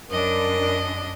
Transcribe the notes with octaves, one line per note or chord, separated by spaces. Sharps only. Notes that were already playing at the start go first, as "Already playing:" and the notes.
F#2 D4 A#4 D#5